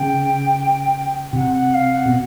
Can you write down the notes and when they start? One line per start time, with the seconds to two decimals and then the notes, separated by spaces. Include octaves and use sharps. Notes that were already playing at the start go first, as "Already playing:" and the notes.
Already playing: C#3 G5
1.32 C3 F#5
1.53 F#5
1.73 F5
1.93 F#5
2.06 B2